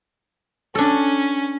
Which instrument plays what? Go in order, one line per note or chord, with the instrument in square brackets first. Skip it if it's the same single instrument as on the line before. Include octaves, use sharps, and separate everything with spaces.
[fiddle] C#4 [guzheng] D4 A4